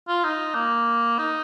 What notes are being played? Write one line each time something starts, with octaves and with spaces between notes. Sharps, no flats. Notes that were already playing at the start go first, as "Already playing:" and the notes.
F4
D#4
A#3
D#4